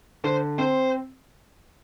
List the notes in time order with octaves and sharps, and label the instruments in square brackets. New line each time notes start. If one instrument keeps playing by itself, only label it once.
[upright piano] D3 [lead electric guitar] C5
[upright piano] C4 [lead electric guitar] C5